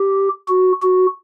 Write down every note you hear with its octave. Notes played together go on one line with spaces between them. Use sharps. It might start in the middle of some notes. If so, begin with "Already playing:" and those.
Already playing: G4
F#4
F#4